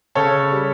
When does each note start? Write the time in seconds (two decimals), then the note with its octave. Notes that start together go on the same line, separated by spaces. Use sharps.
0.15 C#3 A4 C#5
0.52 G3